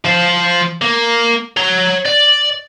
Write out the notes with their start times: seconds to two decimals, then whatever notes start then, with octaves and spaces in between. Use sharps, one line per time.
0.05 F3 C5
0.82 A#3
1.57 C#5 A#5
2.05 D5